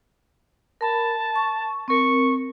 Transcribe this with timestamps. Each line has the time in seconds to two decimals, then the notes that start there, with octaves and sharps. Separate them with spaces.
0.81 A#4 A5 B5
1.36 C#6
1.88 C4 A#4 C#6